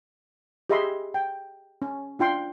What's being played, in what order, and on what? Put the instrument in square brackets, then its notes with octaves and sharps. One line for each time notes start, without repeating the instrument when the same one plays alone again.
[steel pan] G4 G#4 D#5 E5 B5 C6
G5
C#4
D4 F4 G5 C6